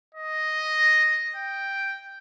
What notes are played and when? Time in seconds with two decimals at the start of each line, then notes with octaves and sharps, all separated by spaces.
0.15 D#5
1.36 G5